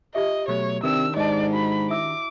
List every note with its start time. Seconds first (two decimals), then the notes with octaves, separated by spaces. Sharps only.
0.15 F4 G4 D#5 E5
0.48 B2 F#3 A3 C#5
0.83 C3 D#3 D4 G4 A#4 B4 D5 E6
1.17 G#2 D5 D#5 A5
1.54 F#4 B5
1.90 E4 E5 D6 E6